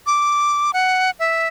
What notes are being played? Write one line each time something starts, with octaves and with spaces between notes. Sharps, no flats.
D6
F#5
E5